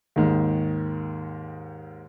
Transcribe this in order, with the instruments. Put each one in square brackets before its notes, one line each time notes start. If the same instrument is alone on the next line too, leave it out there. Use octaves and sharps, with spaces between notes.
[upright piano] D#2 G#2 D#3